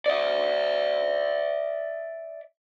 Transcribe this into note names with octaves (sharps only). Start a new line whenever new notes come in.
D5 E5